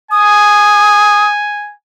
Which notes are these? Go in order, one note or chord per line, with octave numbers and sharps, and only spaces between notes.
G#5 D#6